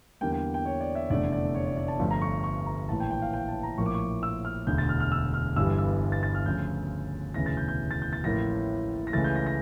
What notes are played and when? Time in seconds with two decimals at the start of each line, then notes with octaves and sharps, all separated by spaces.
0.21 E2 D3 G3 A#3 G5
0.32 G5
0.54 G5
0.65 C#5
0.81 D5
0.95 E5
1.10 F1 E2 D3 A3 D5
1.32 D5
1.55 C#5
1.66 D5
1.77 D5
1.88 A5
1.99 G1 G2 F3 A3
2.11 A#5
2.22 C#6
2.44 C#6
2.66 A#5
2.88 A#1 A2 E3 A5
3.00 G5
3.11 G5
3.22 F5
3.33 G5
3.48 A5
3.63 A#5
3.78 A#1 A2 F3 A#3 C#6
3.86 D6
3.95 C#6
4.23 E6
4.45 F6
4.67 E1 D2 D3 G6
4.78 A6
4.89 F6
5.00 F6
5.12 E6
5.34 F6
5.56 G1 G2 E3 G3 E6
5.78 E6
6.12 A6
6.23 A6
6.35 F6
6.45 D2 C#3 F3 G6
7.34 E1 D2 C#3 E3 A#6
7.46 A6
7.57 G6
7.68 G6
7.91 A6
8.02 G6
8.13 A6
8.24 A1 A2 F3 A#3 A#6
9.07 A#6
9.13 C#2 C#3 E3 A3 A6
9.24 G6
9.36 A#6
9.46 A#6